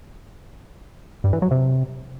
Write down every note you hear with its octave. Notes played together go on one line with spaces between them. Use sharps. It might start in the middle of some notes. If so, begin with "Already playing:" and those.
G2
E3
F#3
C3